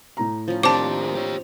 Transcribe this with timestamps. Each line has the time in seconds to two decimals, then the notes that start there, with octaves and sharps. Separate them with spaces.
0.17 A2 A#5
0.48 F3 C#4
0.63 D#2 C4 D4 G4 A5 D6
1.15 G4 C#5